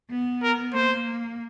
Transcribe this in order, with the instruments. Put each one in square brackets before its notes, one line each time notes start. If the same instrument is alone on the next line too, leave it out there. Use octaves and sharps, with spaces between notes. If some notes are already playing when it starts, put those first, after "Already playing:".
[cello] B3
[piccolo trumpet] A#4
[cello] A#3 [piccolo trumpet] C5